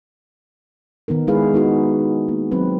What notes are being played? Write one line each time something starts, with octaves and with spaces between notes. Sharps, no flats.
D#3 B3 D#4 A#4
G#3 D#4 E4 G#4 B4 F5
B3 D#4 F#4
A#3
F#3 C4 B4